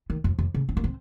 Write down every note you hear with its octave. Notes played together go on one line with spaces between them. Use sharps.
D#3
F2
F2
C#3
C4
A#3
C4